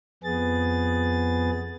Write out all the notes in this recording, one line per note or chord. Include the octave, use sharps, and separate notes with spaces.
F2 B3 G#4 A6